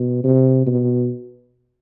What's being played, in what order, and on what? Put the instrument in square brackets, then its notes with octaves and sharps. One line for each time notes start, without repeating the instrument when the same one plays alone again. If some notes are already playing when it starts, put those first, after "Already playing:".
Already playing: [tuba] B2
C3
B2